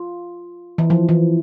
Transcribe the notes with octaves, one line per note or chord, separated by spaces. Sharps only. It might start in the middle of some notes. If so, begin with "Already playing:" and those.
Already playing: F4
E3
F3
E3